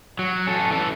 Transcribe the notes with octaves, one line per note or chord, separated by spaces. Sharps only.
F#3
C#4 A4
E3 A4